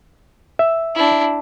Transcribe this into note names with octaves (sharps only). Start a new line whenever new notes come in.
E5
D4 E4